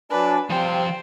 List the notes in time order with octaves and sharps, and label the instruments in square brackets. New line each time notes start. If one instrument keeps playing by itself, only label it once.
[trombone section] F#3 D4 [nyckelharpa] B4 [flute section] G#5 A5
[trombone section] C3 G3 C4 [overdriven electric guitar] F3 G5 [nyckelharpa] C5 [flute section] F5